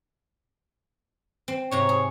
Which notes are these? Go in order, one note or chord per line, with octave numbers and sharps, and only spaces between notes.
C4
G#2 C3 C#5 A#5
G#4